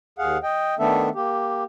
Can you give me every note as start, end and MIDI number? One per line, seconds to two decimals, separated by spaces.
0.19 0.38 39
0.19 0.38 68
0.19 0.38 77
0.19 0.38 78
0.43 0.75 75
0.43 0.75 79
0.79 1.09 51
0.79 1.09 57
0.79 1.09 59
0.79 1.09 62
0.79 1.09 69
0.79 1.09 76
1.15 1.64 58
1.15 1.64 67